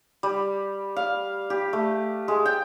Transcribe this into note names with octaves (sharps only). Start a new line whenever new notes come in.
G3
F5
G4
A3
G#3
G5